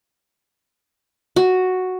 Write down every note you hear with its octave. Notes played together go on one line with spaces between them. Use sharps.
F#4